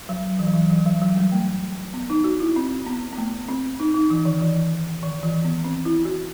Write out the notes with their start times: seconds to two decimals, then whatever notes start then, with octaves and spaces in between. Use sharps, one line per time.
0.09 F#3
0.39 E3
0.46 F#3
0.54 E3
0.70 E3
0.86 F#3
1.02 F#3
1.17 G3
1.32 A3
1.94 B3
2.10 D#4
2.24 F#4
2.40 E4
2.56 C4
2.86 B3
3.13 B3
3.18 A3
3.48 C4
3.80 D#4
3.94 D#4
4.10 E3
4.25 D#3
4.41 E3
5.02 D#3
5.23 E3
5.44 B3
5.64 C4
5.85 E4
6.05 F#4